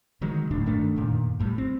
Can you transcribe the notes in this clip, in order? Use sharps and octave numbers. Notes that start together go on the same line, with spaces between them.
D3 D#3 F#3 G#3
D#1 D2 A2 D4
G1 D#3 A3 D4
F1 F#2 A#2 D#3
G#1 A2 D3 G3
C4